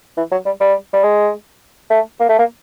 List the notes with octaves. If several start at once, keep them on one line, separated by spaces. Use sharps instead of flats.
E3
F#3
G3
G3
G3
G#3
A3
A#3
A3
A#3